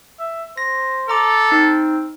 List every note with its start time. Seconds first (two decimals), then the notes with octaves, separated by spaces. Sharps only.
0.20 E5
0.57 C5 A#6
1.09 A4 A#5 D6
1.52 C4 D#4